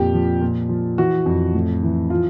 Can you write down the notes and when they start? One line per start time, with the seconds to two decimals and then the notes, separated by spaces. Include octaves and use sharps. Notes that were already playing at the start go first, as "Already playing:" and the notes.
Already playing: F2 A#2 G4
0.14 F3
0.42 A#2
0.69 F3
0.98 E3 F#4
1.26 F2
1.54 A2
1.83 E3
2.10 F3 F4